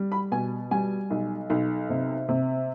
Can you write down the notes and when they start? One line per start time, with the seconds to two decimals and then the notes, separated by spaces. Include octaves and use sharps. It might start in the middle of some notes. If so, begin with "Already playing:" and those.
Already playing: G3
0.12 B5
0.32 B2 G#5
0.71 G3 G#5
1.10 B1
1.50 B1
1.89 C3
2.29 C3